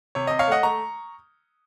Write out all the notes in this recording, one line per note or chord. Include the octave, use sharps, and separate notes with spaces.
C3 C#5
C3 D#5
C#5 F5
A3 D#5 F#5
A3 A#5 C#6